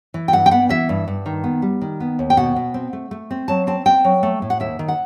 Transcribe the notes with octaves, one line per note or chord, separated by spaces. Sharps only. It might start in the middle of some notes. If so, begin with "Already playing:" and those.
E3
G5
G2 F#5
G5
B3 F#5
E3 E5
G2
G2
D#3
B3
G3
D#3
B3
D#2
G5
B2 F#5
B2
C4
A3
A3
C4
F#3 A5
C4 A5
C4 G5
F#3
A3
A2
F#5
D#2 E5
D#3
F#5